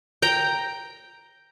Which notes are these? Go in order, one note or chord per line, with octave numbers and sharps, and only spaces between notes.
G5 A#5